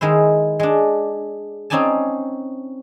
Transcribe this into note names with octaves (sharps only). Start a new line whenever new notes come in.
D#3 G#3 E4 C5
G#3 D4
C4 C#4 D#4 D5 G#5 A5